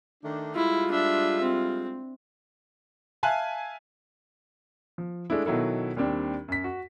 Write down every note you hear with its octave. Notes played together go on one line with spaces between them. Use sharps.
D#3 A3 D4
G3 G#3 E4 F4
D4 E5
C4
E5 F5 G#5 A5 F#6
F3
G#3 A3 D4 E4
B2 D#3 F#3 E4 A4
D#2 G3 C4 D4
F#2 B6
F#4